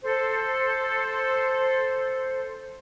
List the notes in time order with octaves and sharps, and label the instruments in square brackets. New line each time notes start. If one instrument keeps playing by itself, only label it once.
[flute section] A4 C5